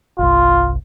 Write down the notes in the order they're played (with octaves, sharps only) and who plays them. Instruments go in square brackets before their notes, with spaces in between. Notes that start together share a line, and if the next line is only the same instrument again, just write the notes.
[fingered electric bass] G1 C2 [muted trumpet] F4